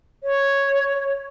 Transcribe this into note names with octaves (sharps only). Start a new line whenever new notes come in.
C#5